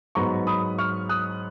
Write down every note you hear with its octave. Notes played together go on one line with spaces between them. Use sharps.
G#2 F#3 B3 A#5 C#6
B5 D#6
C#6 F6
D#6 F#6